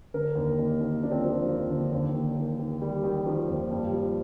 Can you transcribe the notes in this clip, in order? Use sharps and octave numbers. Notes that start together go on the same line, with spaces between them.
D3 A#4
D#2
D#2 D#4
D#2
F3 D4
C4
D4
F3
D#2 F3
D3
D#2
D#3
D#3
D#3
D#3 G3
D#3
D#3 F3
D#2
G2 G3
F3